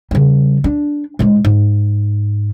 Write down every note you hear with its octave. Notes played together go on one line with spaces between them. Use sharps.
C#3 G3
D4
A2 G#3
G#2